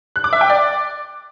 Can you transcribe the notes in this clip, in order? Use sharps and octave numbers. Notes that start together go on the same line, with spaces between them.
F#6
D6
E5
G5
D5